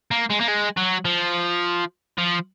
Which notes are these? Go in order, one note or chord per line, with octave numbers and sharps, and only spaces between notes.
A#3
G#3
A#3
G#3
F#3
F3
F3